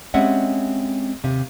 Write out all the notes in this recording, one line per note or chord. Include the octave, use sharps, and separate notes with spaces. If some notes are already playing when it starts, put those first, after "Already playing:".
G3 G#3 C4 C#4 E5 F#5
D#2 C3 F5